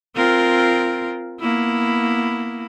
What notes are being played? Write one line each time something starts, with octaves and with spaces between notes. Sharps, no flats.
C4 F4 A#4
A#3 B3 E4